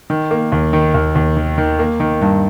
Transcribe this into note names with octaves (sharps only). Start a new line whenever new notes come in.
D#3
A#3
D#2
D#3
D#2
D#2
D#3
D#3
A#3
D#3
G2